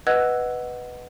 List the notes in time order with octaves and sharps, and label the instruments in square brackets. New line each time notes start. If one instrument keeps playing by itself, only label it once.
[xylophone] B4 D#5 F#5 E6 F#6 G#6